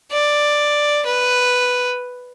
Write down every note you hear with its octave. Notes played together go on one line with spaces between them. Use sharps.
D5
B4